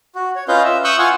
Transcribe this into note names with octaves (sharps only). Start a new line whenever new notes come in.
F#4
C#5
C#4 F4 B4 D#5 F5 G6
E5
C#6 D#6 E6 F#6 G6
F4 F5 F#5 G#5 C#6